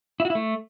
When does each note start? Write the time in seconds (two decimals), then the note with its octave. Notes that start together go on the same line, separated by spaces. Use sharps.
0.20 E4
0.25 F#4
0.30 E4
0.35 A3